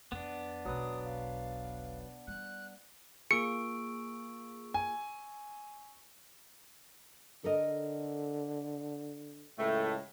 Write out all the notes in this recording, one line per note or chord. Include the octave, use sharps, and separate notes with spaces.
F2 B3 D4
E1 B1 F#3 B4 D#6
F5
G3 F#6
A#3 F4 G#4 C#6 E6 C#7 D7
G#5
D3 A4 A#4 D#5
C#2 A2 A3